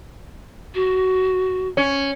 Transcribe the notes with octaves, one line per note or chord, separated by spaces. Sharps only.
F#4
C#4